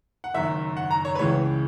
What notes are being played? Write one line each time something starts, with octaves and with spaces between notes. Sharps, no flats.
F#5
F#1 F#2 D#3 E5
F#5
A#5
C#5
B4
C#2 C#3 E3 G#3 C#5